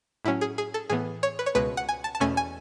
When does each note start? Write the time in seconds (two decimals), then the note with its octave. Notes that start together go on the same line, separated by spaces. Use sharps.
0.25 A2 F#3 C#4 E4
0.41 G#4
0.58 G#4
0.74 A4
0.90 A2 E3 B3 G#4
1.23 C#5
1.39 B4
1.46 C#5
1.55 C#2 B2 G#3 B4
1.77 F#5
1.89 G#5
2.04 A5
2.15 A5
2.20 E2 B2 A3 C#4 G#5
2.37 G#5